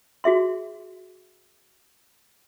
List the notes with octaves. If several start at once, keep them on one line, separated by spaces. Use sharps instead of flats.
F#4 G#4 E5 C6